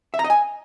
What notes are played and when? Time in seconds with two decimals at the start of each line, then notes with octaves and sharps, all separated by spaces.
0.14 E5
0.19 A#5
0.24 D#5
0.30 G#5